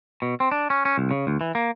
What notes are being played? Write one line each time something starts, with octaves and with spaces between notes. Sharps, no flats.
B2
C4
D4
C#4
C#4
C2
C#3
D2
E3
A#3